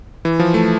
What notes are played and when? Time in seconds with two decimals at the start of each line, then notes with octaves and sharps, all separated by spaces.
0.25 E3
0.39 F3
0.54 A3